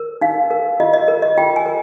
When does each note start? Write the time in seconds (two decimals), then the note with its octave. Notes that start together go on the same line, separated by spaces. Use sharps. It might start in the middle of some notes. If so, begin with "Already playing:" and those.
Already playing: A#4
0.21 D#4 F5
0.51 A#4
0.80 F4 D#5
0.94 D#5
1.08 A#4
1.22 D#5
1.38 F4 G5
1.56 G#5
1.66 A#4